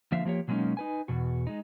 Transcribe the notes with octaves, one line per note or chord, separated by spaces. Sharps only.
D3 F3 A#3 E5 F5
F3 A#3 G4 C#5
B2 F#3 G#3 A#3 C#4 D#4
D#4 B4 G#5
E2 B2 F#4
G#3 D#4